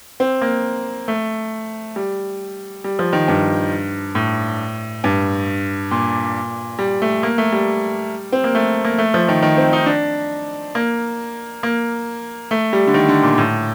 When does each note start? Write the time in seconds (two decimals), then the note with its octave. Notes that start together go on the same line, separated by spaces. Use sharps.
0.20 C4
0.42 A#3
1.08 A3
1.96 G3
2.84 G3
2.99 F3
3.13 D#3
3.28 G2
4.15 A2
5.04 G2
5.91 A#2
6.79 G3
7.02 A3
7.23 A#3
7.38 A3
7.52 G3
8.32 C4
8.44 A#3
8.55 A3
8.85 A#3
8.98 A3
9.14 F3
9.28 D#3
9.43 D#3
9.57 C4
9.73 D#4
9.86 D4
10.75 A#3
11.63 A#3
12.51 A3
12.73 G3
12.87 D3
12.94 D#3
13.08 D3
13.23 A#2
13.38 A2